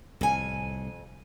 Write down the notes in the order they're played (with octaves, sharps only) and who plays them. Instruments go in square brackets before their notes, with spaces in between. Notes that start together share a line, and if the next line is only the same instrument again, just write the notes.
[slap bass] C2 A2 [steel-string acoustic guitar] F2 G#5